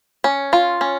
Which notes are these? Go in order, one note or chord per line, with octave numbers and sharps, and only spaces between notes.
C#4
F4
C#4